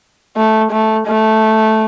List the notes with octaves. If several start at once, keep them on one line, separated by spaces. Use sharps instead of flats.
A3
A3
A3